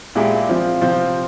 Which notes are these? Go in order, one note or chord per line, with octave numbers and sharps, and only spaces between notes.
A#2 G#3 E4 G4
F3 C4 F4
C3 F3 C4 F4 C5